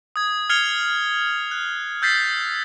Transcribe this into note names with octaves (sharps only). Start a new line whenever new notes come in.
D#6 G#6
F6 G#6 C7 C#7 F7 G7
F#6
E6 G6 A6 B6 C7